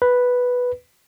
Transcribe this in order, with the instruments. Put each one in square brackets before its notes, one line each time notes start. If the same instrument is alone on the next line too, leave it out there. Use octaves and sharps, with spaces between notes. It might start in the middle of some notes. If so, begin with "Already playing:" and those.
[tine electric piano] B4